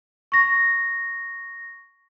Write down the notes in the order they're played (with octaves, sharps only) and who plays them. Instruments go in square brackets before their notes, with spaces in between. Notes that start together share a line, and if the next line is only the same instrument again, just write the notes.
[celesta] C#6 A#6